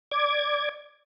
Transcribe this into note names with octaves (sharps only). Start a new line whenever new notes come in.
D5 D6 G#6